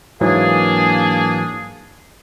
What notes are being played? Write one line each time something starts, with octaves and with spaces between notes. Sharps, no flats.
G#2 E3 F#3 A#3 D4 G#4